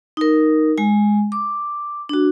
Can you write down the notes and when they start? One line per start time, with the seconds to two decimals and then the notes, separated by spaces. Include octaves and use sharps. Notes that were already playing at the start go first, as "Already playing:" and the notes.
0.17 D#4 A#4
0.78 G#3 G#5
1.32 D6
2.09 D4 F#4